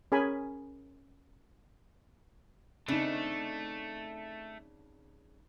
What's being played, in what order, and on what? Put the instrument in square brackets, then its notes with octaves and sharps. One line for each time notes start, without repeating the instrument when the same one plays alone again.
[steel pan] C#4 G#4 A#4 G#5 B5
[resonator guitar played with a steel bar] C#3 D4 [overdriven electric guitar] A3 [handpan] C4 D#4